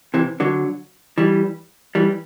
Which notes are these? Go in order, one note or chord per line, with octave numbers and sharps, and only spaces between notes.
C3 E3
D3 F#3
E3 G3
E3 G3